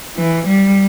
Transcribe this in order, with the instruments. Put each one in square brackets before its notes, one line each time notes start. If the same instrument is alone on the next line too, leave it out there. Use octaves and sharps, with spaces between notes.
[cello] E3
G3